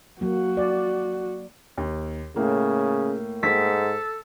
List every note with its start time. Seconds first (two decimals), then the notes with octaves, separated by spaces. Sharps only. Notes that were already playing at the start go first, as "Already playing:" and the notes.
0.21 F#3 A#3 F#4
0.57 D5
1.78 D#2
2.36 A2 C#3 A#3
3.43 G#2 A4 B6